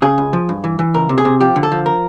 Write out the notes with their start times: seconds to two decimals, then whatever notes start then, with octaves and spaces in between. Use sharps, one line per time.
0.02 C#3 G#4
0.18 C#2
0.33 F3
0.49 G2
0.64 E3
0.79 E3
0.94 C#2 A#4
1.09 C3
1.18 G#4
1.25 C3
1.40 F3 G4
1.56 D3
1.63 A4
1.72 F3
1.86 A#4